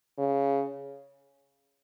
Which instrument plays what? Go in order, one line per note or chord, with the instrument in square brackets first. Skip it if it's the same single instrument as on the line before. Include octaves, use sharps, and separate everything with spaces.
[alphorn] C#3